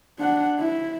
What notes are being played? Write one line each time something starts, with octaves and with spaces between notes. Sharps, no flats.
D4 F#5
E4